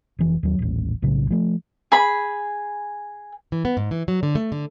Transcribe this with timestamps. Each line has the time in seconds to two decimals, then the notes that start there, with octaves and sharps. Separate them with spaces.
0.19 F1 E3
0.43 D#2 F#3
0.59 D#1 A1
1.02 B1 A2 C#3
1.30 F3 A3
1.92 G#4 B5
3.52 E3
3.65 B3
3.77 G#2
3.91 E3
4.08 F#3
4.23 D3
4.35 A3
4.52 D3